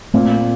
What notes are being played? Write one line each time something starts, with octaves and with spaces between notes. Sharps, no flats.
A#2 A3 C4